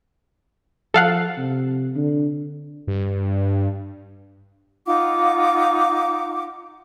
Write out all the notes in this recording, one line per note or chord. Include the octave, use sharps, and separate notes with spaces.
F3 A4 F5 F#5
C3
D3
G2
D#4 F4 F#5 D6